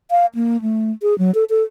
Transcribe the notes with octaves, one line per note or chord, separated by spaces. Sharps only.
F5
A#3
A3
G#4
F#3
A4
A4